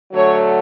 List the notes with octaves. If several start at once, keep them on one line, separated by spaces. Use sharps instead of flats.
D3 F#3 A3 C#5